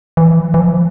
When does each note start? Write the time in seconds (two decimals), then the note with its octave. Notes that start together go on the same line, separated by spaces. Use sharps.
0.17 E3
0.39 F3
0.54 E3
0.59 F3